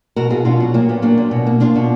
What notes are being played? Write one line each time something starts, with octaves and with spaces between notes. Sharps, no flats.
B2 F#4 A#4
B2 F4 G#4
B2 D4 F4
F#3
A#2 A#3
A#2 B3
F#3 A#3 D4
A#2
B2
A#3
A#3 D4 F4
B2